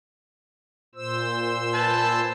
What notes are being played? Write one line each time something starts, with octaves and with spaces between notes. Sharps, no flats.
A#2 C5 E6
B4 G#5 A5